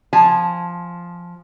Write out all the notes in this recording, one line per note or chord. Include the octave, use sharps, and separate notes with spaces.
F3 G#5 A5